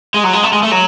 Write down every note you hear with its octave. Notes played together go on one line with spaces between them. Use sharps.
G#3
F#3
G#3
A3
G#3
A3
F#3